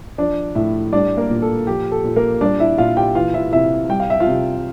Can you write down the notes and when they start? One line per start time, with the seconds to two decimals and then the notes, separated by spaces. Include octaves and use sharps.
0.18 F3 D4 D5
0.55 A2 E4 E5
0.93 G3 D4 D5
1.17 A#3 A#4
1.30 A#2
1.42 A4
1.67 F3 G4
1.92 A4
2.04 A#2
2.16 A#3 A#4
2.41 G3 D4 D5
2.60 E4 E5
2.78 A#2 F4 F5
2.97 G4 G5
3.15 E3 F4 F5
3.34 E4 E5
3.53 C3 E4 E5
3.89 G3 G5
4.00 F5
4.10 E5
4.20 F4 F5
4.27 C3